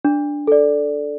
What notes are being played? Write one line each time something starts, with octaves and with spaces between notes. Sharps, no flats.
D4
A4 D5